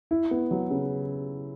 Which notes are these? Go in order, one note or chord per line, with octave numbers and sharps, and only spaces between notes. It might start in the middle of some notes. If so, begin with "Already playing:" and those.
E4
B3
F#3
C#3